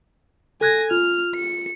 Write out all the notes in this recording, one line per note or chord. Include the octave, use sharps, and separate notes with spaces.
A4 G#5 F#6 G#6 A#6
F4 F6
C#7